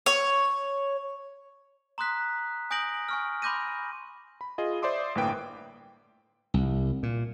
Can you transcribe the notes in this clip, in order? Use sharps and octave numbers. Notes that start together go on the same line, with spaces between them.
C#5
A#5 C6 D#6 F#6 B6
G#5 D#6 G6 A#6 D7 F#7
G#5 C#6 F6
B5 C6 D6 G6 A#6 D#7
B5
F4 G#4 D#5
C5 D5 E5 C6 D6 D#6
G1 A2 A#3 B4 G5 D7
C2
A#2